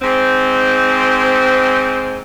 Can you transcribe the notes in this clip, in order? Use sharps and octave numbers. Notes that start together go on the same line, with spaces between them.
G#2 C4